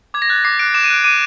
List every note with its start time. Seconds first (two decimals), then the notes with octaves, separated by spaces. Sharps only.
0.14 D6 G#6
0.22 A#6
0.29 F#6 A6
0.45 D6 C7
0.59 F#6 D7
0.74 D6 E7
0.84 D#7
0.90 F#6 D7
1.04 D6 D#7